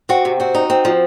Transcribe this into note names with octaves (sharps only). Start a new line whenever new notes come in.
C4 F#4
C3
C4 F#4
D#4
C4
F3